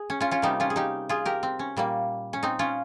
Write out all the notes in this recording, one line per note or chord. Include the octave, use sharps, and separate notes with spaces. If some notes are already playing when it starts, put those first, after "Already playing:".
Already playing: G#4
C#4
C#4 F4
C#4 F4
C3 G3 A#3 D#4 G4
C#4 F4
G#4
D#4 G4
F4 G#4
G4 A#4
C4
C#4
A#2 G3 A#3
C#4
C4 D#4
C#4 F4